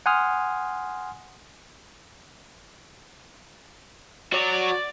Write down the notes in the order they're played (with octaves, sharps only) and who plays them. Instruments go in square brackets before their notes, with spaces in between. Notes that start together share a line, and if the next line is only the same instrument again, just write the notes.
[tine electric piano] F#5 G#5 C6 D#6 F6
[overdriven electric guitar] F#4 C#5 [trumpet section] D5